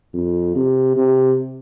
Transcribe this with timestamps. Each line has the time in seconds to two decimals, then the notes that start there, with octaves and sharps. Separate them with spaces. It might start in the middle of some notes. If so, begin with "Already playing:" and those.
0.14 F2
0.56 C3
0.97 C3